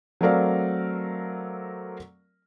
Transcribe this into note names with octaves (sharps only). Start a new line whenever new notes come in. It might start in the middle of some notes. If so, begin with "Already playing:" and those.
F#3 A3 C4 A#4 D5 F5